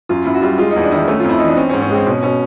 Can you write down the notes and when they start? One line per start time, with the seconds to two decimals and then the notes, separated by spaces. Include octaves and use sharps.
0.09 F#2 F4
0.25 F#2 E4
0.34 F#4
0.42 G3 F4
0.58 G#3 F4
0.70 D#4
0.76 E2
0.84 D4
0.92 D#3 D#4 E4
1.08 A3 C#4
1.20 F2 F4
1.30 E4
1.38 E3 D#4
1.48 D4
1.57 C4 C#4
1.70 G#2 C#4
1.82 C#4
1.90 G#3 C4
2.07 B2 C#4
2.23 B2 C#4